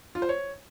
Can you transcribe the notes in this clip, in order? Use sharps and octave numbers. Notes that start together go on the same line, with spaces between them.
F4
C5
C#5